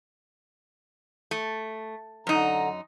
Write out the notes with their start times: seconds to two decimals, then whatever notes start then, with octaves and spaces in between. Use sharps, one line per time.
1.31 A3
2.27 F#2 D3 D#4 A#5